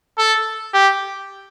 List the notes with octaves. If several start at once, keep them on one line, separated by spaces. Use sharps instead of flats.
A4
G4